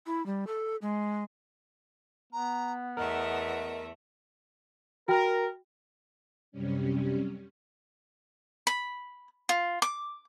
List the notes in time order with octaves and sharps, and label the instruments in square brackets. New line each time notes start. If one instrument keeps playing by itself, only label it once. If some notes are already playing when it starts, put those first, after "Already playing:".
[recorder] E4
G3
A4
G#3
[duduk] B3 [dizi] A#5
[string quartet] E2 A3 E5 [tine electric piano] A#4 [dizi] D#5
[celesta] F#4 G5 [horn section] A#4
[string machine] F#2 C3 G3 C#4
[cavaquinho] B5
F4
D6